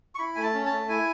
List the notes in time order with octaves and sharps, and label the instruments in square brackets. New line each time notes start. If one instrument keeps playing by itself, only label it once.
[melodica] C#6
E4 B5
A3 G#5
A5
C#4
A5
A3
E4 G#5